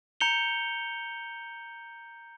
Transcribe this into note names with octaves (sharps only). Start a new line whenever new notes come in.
A#5 G6 C#7 F7 G7